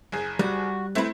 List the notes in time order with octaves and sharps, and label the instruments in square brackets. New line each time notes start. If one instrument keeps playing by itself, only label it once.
[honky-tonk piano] F#1 G#4
[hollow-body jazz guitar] G3 [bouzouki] F#4
[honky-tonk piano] A3 C4 E4 [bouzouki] B4 C5